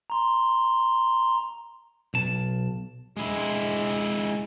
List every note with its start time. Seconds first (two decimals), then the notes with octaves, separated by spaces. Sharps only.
0.10 A#5 C6
2.14 B1 A5
3.17 G#3 E4